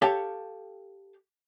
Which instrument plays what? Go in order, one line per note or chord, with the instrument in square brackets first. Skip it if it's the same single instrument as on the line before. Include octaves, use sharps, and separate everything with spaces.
[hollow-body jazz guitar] G4 A4 C#5 F5 G5 A5